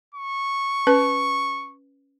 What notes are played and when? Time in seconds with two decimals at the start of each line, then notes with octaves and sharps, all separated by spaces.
0.14 C#6
0.87 C#4 B4